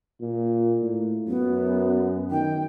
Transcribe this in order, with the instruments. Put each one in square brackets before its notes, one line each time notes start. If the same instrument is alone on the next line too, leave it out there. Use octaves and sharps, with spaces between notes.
[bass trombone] A#2
A2
[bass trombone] F#2 [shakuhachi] B3
[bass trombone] D#3 [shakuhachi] G5